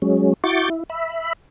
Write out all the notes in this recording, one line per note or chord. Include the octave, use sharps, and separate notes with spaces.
F#3 G#3 C#4
E4 F#4 C#6 D6 G6 A6
E4
E5 B5